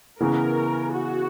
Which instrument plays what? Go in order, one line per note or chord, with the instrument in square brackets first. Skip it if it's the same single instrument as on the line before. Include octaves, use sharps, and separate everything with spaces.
[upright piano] C#3 E3 B3 [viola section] A#4
[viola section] F#4